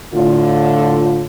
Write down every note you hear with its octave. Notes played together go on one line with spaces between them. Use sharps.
A2 D3 F4